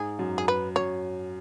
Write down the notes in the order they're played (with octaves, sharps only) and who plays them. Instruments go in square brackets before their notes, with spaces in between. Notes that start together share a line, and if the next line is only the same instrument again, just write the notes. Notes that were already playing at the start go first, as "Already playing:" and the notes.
Already playing: [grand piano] G#2 [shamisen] G#4
[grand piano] F#2
[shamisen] G#4
B4
[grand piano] F#2 [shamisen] C#5